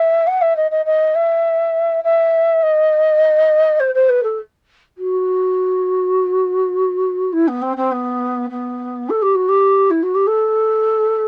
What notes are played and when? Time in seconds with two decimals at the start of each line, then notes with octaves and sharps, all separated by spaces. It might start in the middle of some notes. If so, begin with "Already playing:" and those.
Already playing: E5
0.27 F#5
0.41 E5
0.56 D#5
0.70 D#5
0.85 D#5
1.14 E5
2.04 E5
2.62 D#5
3.79 C5
3.94 C5
4.09 B4
4.23 A4
4.97 F#4
7.32 E4
7.47 B3
7.62 C4
7.76 C4
7.91 B3
8.50 B3
9.09 A4
9.22 G4
9.35 F#4
9.48 G4
9.90 E4
10.02 F#4
10.14 G4
10.27 A4